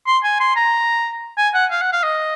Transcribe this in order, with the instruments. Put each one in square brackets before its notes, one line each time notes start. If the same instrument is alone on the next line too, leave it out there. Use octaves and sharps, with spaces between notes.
[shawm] C6
G#5
C6
A#5
G#5
F#5
F5
F#5
F5
D#5